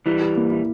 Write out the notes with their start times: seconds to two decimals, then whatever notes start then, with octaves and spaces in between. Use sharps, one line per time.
0.06 E3 G3 E4
0.21 G4
0.37 A#3
0.52 E4